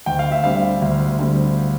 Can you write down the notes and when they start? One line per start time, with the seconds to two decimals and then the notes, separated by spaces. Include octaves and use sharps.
0.06 D2 G5
0.19 F5
0.32 E5
0.44 D3 G3 C4 F5
0.82 D2
1.18 D3 G3 C4